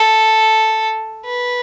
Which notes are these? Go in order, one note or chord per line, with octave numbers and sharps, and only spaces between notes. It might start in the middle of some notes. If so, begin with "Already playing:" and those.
Already playing: A4
B4